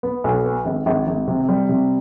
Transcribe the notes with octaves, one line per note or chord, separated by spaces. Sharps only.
B3
B1
B3
G#1
G#1
G#1
C3
G3
C3